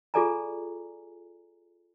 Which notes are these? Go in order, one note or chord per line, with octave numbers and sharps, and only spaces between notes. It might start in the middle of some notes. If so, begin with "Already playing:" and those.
F4 G#4 A4 D5 G#5 A#5